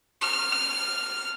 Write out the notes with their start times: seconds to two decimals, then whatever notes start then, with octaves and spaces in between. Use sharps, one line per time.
0.22 F6